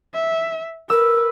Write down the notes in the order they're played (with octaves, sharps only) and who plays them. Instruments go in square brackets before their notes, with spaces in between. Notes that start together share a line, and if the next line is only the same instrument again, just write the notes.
[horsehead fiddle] E5
[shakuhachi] A#4 [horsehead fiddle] B4 [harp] E6